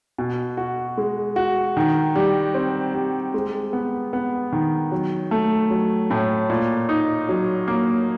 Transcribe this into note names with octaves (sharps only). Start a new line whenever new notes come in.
B2
F#4
G#3
F#4
D#3
G3
C4
G3
G#3
B3
B3
D#3
F#3
A3
F#3
A2
A#2
D#4
F#3
A#3